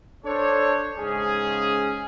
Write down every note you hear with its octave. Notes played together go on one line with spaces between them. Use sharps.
D4 A4 C5 C#5
G#2 C#3 C#4 G#4